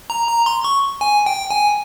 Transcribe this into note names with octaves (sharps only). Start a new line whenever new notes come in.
A#5
A#5
C6
C#6
G#5
G5
G#5